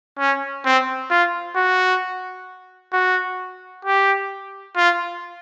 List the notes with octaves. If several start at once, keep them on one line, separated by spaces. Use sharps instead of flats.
C#4
C4
F4
F#4
F#4
G4
F4